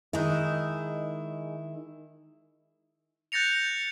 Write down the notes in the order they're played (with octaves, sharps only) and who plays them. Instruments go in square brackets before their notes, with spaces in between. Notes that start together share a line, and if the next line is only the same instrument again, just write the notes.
[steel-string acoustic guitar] D#3 E4 [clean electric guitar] G#3 D#4
[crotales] F#6 G6 A6 A#6 C#7 F7